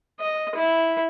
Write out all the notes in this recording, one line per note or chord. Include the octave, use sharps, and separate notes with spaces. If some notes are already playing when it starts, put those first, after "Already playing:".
D#5
E4